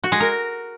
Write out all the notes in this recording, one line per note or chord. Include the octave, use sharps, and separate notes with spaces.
F#4
G#3
A#4